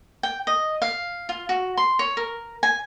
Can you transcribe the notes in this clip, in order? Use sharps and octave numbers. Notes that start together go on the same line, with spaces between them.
G5
D#5
F5
F4
F#4
C6
C#5
A#4
G#5